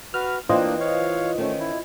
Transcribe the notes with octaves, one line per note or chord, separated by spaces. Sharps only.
F#4 B4 F6
E3 A#3 C4 D4 E4 F4 C5 D#5
C#5 F5
D#3 A3 C#4
E4